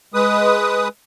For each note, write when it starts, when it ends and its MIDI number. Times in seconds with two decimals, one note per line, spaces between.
0.14 0.88 56
0.14 0.88 71
0.14 0.88 87